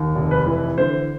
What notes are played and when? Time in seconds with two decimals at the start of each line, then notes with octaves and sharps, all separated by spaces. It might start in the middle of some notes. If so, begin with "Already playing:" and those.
Already playing: D#2
0.15 F1
0.31 B4
0.46 E3
0.78 D3 C5